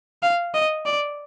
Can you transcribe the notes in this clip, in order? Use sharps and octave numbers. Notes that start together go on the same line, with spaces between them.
F5
D#5
D5